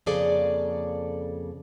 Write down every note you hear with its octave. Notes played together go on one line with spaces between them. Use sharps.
F2 C#3 A#3 G#4 A4 D5